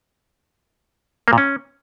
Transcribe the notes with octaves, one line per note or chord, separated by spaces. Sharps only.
A#3
A#2
C#4